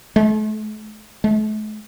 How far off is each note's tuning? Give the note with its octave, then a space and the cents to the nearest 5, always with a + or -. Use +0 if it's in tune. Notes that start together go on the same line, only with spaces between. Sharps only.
A3 -40
A3 -45